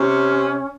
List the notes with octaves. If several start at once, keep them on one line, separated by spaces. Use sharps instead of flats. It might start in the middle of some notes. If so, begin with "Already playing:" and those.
Already playing: C3 C#4